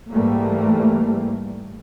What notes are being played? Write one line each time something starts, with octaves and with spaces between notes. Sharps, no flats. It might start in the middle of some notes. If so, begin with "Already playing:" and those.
G#2 E3 G3 A3 A#3